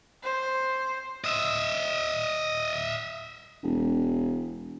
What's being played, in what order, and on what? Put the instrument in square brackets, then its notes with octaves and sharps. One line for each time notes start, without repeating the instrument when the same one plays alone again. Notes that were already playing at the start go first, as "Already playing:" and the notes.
[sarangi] C5
[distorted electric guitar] D#5 E5
[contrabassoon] E1